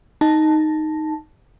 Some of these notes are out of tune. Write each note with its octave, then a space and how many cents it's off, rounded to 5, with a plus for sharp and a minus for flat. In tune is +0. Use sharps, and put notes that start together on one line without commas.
D#4 +0 A5 +0